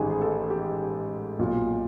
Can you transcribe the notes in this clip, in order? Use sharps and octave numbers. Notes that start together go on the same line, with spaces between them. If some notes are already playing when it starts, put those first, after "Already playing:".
Already playing: A1 G#2 D#3 G4 G#4
G#4
A4
G4
B1 A#2 F#3